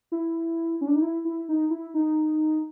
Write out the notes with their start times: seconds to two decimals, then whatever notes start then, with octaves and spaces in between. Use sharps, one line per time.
0.12 E4
0.81 C#4
0.87 D4
0.95 D#4
1.02 E4
1.25 E4
1.49 D#4
1.70 E4
1.94 D#4